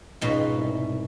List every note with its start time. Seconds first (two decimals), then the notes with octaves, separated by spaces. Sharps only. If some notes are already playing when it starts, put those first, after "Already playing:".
0.21 C#2 G#2 B2
0.57 C2